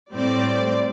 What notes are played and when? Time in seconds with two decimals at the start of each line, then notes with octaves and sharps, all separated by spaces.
0.13 A2 G3 C4 D5